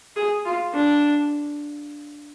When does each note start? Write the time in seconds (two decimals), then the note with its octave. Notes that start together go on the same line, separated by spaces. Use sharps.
0.16 G#4
0.45 F4
0.74 D4